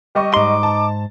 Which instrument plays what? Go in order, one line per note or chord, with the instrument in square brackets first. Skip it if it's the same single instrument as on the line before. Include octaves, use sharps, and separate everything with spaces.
[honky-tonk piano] G3 D#5 C#6 [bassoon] G4
[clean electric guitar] G#2 C6 [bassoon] D#4 [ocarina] D6
[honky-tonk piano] A5